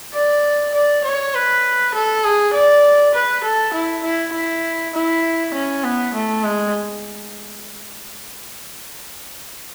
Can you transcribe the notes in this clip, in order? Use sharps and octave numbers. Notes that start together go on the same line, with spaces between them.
D5
D5
C#5
B4
A4
G#4
D5
B4
A4
E4
E4
E4
E4
C#4
B3
A3
G#3